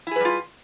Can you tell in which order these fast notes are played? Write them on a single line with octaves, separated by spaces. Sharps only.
E4 G#4 B4 G3 F4